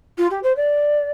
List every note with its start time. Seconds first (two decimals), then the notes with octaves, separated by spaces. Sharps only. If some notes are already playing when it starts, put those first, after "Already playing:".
0.18 F4
0.31 G4
0.43 C5
0.56 D5